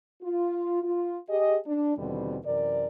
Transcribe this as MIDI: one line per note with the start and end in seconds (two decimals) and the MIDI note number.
0.22 0.81 65
0.82 1.17 65
1.29 1.56 67
1.29 1.56 68
1.29 1.56 75
1.66 1.96 62
1.97 2.37 39
1.97 2.37 47
1.97 2.37 50
1.97 2.37 52
1.97 2.37 55
1.97 2.37 60
2.45 2.87 42
2.45 2.87 48
2.45 2.87 52
2.45 2.87 70
2.45 2.87 74